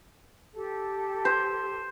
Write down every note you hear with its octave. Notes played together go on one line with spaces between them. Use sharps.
G4 A4
C5